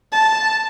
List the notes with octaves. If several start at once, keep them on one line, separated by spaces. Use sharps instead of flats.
A5